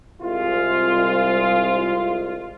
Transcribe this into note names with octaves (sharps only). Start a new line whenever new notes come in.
C2 G#3 F4